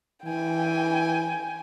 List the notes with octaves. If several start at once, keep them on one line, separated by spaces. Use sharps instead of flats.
E3 G5 G#5